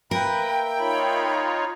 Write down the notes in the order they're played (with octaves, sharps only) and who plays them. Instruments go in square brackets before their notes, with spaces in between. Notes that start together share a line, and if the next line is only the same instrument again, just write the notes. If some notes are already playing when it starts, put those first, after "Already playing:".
[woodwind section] A#3 E5 G5 [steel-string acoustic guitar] A#4 [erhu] B4
[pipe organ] D#4 F4 C#5 [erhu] B5